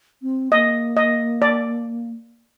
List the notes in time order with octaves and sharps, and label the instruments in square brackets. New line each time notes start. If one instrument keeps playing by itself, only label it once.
[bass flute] C4
[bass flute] A#3 [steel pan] D#5
[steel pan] D#5
D5